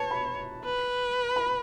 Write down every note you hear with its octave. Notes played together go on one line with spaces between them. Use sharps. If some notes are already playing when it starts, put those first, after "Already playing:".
Already playing: B4 C#5 A5
B5
B4
B5